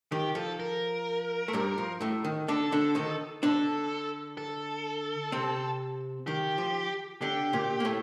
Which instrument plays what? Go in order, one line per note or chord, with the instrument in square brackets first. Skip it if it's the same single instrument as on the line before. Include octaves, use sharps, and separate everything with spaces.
[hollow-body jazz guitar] D#3 [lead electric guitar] G4
[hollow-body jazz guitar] F3 [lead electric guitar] A4
[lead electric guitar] A#4
[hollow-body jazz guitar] A3
G2 G3
F3
A2 A3
D#3
[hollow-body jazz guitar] D3 D4 [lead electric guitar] A4
[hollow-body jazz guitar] D3 D4
D#3 D#4
[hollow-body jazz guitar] D3 D4 [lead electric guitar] A4
[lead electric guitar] A4
[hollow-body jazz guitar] C3 C4
[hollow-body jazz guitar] D#3 [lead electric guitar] G4
[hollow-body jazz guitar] F3
[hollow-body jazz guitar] D3 D4 [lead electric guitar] G4
[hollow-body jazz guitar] A#2 A#3
A#3
A2 A3